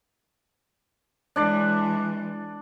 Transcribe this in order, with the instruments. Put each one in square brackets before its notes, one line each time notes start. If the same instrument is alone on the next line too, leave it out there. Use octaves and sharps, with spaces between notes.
[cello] E3 G#3 [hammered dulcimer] D4 D5